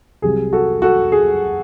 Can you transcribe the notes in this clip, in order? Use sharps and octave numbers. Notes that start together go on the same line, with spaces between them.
C2 C3 F#3 G#4
F#4 A4
F#4 A4
G#4